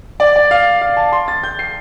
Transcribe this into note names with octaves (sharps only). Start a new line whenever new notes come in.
D5
D5
F5
F5
A5
C6
A6
G6
C7